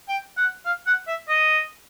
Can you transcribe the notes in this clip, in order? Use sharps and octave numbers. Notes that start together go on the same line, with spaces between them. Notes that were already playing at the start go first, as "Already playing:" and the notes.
G5
F#5
F5
F#5
E5
D#5